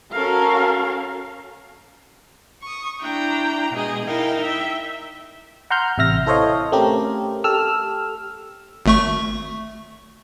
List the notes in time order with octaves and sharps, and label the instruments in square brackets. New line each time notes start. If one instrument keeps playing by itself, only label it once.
[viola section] C#4 F#4 A4 A#4 F5
[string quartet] C#6 D#6
D4 E4 G5 A#5
B2 G#3 G#4 D#5 G#5
D#4 E4 A#4 F5 G5
E5 G5
[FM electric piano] F#5 A#5 C6 F6 G6
A1 C3 E5 F6 A#6
E4 A4 C5 C#5 D#5 F5
A3 C4 C#4 G4 A#4
G4 A4 E6 F6
[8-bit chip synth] G#1 A3 C#6